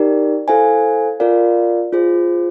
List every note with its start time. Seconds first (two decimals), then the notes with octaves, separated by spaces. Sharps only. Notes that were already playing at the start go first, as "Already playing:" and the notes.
Already playing: D#4 G4 A#4 D5
0.48 E4 A4 C5 F5 G#5
1.20 F4 A#4 D5 F5
1.93 F4 G#4 C5